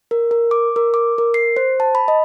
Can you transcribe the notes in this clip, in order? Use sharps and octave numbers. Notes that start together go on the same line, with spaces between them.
A#4
A#4
D6
A#4
D6
A#4
C7
C5
A5
B5
D#5